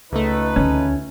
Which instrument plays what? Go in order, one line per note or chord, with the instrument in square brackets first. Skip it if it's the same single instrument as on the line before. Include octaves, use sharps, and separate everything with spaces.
[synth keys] C#2 A3 [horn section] D#4 B4
[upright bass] D2 [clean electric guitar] C#4